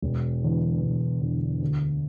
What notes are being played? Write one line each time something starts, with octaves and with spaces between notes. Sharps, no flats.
E1
E2 D3
E1
E2 D3
D2